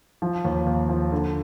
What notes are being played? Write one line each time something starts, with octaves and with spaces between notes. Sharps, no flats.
F3
D#2
D#2
F3
D3